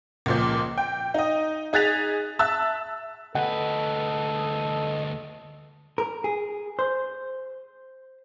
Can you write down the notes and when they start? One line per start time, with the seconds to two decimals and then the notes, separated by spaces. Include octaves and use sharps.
0.26 C#2 A#2 F3
0.78 G5
1.14 D#4 D#5
1.73 D#4 G#4 F#6 A6 B6 F7
2.39 E5 A5 E6 F#6
3.35 D2 A4 B4 D#5 F#5
5.98 A#4
6.24 G#4
6.79 C5